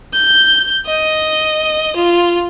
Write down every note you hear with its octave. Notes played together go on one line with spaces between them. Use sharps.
G6
D#5
F4